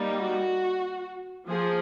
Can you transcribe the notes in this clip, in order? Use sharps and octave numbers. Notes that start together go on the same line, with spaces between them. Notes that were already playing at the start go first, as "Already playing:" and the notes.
Already playing: G3 A#3 D#4
F#4
F3 A#3 G#4